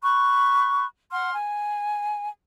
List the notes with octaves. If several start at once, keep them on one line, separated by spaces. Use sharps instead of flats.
B5 C#6 F#6
F#5 C6 F6
G#5